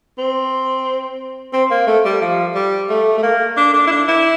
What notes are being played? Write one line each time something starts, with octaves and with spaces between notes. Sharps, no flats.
C4
C4
A#3
A3
G3
F3
G3
A3
A3
A#3
D4
D4
E4
D4
E4